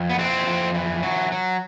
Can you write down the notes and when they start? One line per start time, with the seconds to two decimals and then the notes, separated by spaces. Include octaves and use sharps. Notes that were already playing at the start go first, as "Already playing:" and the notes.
Already playing: F2
0.09 B3
0.19 E3 C4
0.46 F2
0.75 E3
1.03 F#3
1.32 F#3